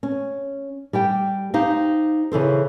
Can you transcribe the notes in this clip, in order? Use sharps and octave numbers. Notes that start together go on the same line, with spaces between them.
C#4
G3 G4 G5
D#4 G4 C5 F5
C#3 E3 A4 C5